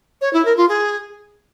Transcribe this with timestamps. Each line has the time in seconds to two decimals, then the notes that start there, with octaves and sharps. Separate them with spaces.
0.21 C#5
0.33 E4
0.45 A#4
0.57 F4
0.69 G#4